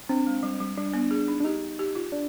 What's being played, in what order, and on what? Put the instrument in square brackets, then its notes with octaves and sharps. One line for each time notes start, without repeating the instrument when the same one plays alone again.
[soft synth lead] C4 [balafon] D4
[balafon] G#3
G3
G3
[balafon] G3 [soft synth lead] D4
[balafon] B3
G#4
D#4
[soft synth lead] D4
[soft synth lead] D#4 [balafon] G4
[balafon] G4
F4
[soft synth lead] D4